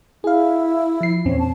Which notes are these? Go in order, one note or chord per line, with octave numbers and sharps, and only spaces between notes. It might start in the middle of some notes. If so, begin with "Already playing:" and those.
E4 G#4 F5
F3 C7
E2 A#2 C4 C#4
A5